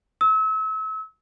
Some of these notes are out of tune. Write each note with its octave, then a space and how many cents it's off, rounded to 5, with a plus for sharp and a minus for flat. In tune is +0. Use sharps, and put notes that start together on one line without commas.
E6 -35